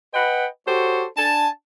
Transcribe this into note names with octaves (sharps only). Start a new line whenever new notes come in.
B4 D#5 F#5 G5 B5
F#4 G4 A4 C5 C#5
D4 G#5 A5